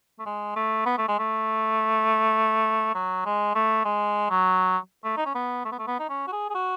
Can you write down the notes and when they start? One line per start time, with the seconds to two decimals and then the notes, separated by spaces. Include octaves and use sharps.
0.19 A3
0.26 G#3
0.56 A3
0.86 B3
0.98 A3
1.08 G#3
1.19 A3
2.95 F#3
3.26 G#3
3.55 A3
3.85 G#3
4.30 F#3
5.05 A3
5.17 D#4
5.26 C#4
5.35 B3
5.65 A3
5.72 B3
5.79 A3
5.87 B3
5.99 D#4
6.09 C#4
6.27 F#4
6.32 G#4
6.50 G#4
6.54 F#4